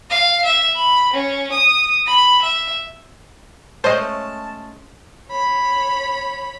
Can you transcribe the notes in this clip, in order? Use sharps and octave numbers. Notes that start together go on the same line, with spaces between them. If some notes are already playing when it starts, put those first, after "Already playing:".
F5
E5
B5
C#4
D#6
B5
E5
G#3 A3 C#4 C5 D#5 A5
C#5 B5